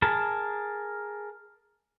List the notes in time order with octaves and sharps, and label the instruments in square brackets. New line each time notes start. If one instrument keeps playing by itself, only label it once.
[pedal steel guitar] G#4 A#4 A5